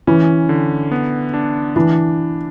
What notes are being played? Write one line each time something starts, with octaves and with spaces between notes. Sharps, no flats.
E3 C#4
D3
B3
D4
E3 D4